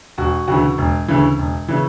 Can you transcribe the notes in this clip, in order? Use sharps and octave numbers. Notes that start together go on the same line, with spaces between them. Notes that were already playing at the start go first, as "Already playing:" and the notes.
E1 F#4
D2 C#3 E3 F#4
E1
D2 C#3 E3
E1
C#3 E3